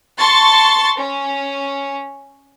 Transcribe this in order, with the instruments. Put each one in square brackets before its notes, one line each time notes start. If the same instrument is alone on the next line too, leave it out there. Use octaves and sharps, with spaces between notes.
[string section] A5 C6 C#6 A6
C#4